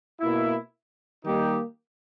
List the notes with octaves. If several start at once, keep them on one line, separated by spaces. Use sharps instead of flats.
B2 A#3 E4
D#3 G3 A#3 D#4 G4